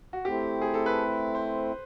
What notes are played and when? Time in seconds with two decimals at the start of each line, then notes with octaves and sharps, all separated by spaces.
0.13 F#4
0.25 A3 C4 E4 G4
0.61 G#4
0.74 A4
0.86 B4
1.35 C5